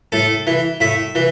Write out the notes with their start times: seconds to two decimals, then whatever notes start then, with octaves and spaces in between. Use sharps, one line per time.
0.12 A2 A4
0.47 E3
0.80 A2 E5
1.15 E3